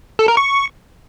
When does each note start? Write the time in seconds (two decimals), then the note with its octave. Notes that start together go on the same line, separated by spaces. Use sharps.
0.19 A4
0.28 A#4
0.37 C#6